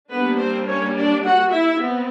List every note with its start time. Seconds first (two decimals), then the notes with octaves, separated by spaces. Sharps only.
0.11 G3 A#3 B3 D4 B4
0.39 C4 C5
0.68 C#4 C#5
0.96 D4 D5
1.24 F#4 F#5
1.52 E4 E5
1.80 B3 C4